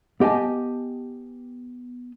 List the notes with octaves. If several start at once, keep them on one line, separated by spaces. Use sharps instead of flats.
B3 G4 D#5 G#5 A5